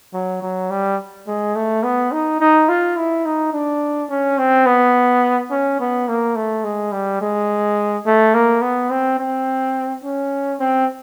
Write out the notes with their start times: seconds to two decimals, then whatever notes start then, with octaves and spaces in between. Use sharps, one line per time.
0.13 F#3
0.42 F#3
0.70 G3
1.27 G#3
1.55 A3
1.83 B3
2.12 D#4
2.40 D#4
2.69 F4
2.97 E4
3.25 D#4
3.53 D4
4.10 C#4
4.38 C4
4.66 B3
5.51 C#4
5.80 B3
6.08 A#3
6.35 A3
6.64 G#3
6.92 G3
7.21 G#3
8.06 A3
8.34 A#3
8.62 B3
8.90 C4
9.19 C4
10.04 C#4
10.60 C4